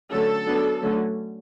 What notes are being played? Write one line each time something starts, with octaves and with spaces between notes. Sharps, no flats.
D3 F#3 A3 C#4 A4
F#3 B3 D4
D3 F#3 A3 C#4